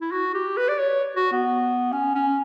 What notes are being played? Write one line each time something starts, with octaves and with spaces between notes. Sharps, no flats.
E4
F#4
G4
B4
D5
C#5
F#4
B3
C#4
C#4